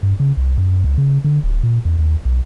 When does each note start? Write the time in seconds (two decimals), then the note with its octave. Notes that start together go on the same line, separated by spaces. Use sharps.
0.03 G2
0.20 C#3
0.37 C2
0.58 F#2
0.84 C#2
0.98 C#3
1.24 D3
1.44 D1
1.63 A#2
1.85 E2
1.98 D#2
2.25 B1